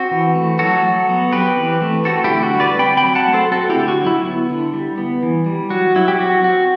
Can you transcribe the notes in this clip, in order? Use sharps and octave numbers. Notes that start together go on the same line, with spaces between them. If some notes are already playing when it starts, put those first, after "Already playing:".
Already playing: C4 F#4
E3
A3
F#3 F#4 A4
F#3
B3
C4 G4 B4
E3
A3
C4 F#4 A4
E4 G4
D3
F#4
G3
B4 D5
C4 G5 B5
G5 B5
F#3
F#5 A5
A3
A4 C5
C4 F#4 A4
E4 G4
D3
F#4
F#3
E4
B3
D3
G3
B3
E3
G3
F#3 F#4
F#3 E4
G4
C4 F#4
C4 F#4